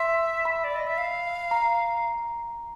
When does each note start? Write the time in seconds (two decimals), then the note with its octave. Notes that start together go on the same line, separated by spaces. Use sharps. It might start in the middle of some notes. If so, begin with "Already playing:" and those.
Already playing: E5 C6
0.45 B5
0.64 D5
0.76 D#5
0.87 E5
0.98 F5
1.51 A#5